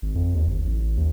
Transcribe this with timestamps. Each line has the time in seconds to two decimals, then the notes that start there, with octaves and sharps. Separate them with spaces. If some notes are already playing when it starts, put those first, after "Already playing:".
0.02 G#1
0.15 F2
0.35 D#2
0.47 G1
0.64 A1
0.97 D#2